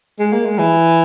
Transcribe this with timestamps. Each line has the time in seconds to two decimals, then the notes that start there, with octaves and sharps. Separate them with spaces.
0.19 G#3
0.33 A#3
0.46 G#3
0.59 E3